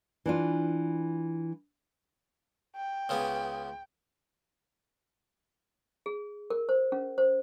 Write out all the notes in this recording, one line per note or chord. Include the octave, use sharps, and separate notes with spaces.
E3 D4 F4
G5
C#2 C#3 B3
G#4
A#4
C5
C#4
C5